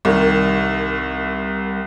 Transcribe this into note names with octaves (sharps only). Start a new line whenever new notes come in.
C2 D#3